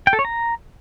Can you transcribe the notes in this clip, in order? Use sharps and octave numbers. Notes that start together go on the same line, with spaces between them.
G5
A4
C#5
A#5